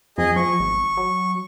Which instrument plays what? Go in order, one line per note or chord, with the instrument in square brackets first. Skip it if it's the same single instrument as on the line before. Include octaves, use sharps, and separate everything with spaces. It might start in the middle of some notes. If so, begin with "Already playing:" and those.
[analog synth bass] F2 [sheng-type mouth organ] G#4 D#5
[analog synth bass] F3 [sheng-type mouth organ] C#6
[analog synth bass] G#1
F#3